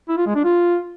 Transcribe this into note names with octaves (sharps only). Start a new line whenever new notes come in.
E4
F4
G#3
D4
F4